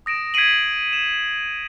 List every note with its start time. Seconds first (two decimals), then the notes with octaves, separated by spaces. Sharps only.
0.06 D#6 A#6 D7 E7
0.34 G#6 B6 C7 D7 D#7 F#7
0.93 E7